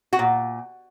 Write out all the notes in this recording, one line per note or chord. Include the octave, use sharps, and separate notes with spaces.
F#4
A#2